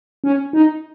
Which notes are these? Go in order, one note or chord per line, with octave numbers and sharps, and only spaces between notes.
C#4
D#4